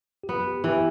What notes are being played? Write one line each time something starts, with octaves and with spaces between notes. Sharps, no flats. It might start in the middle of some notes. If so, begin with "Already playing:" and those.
G4
B3 F4
G4
E3 G4